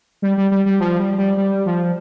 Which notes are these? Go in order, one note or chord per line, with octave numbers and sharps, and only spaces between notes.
G3
G3
G3
G3
F3
G3
G3
G3
F3